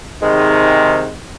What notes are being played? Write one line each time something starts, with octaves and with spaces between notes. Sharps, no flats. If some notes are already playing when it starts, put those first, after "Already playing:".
G#2 C3 D#3 G#3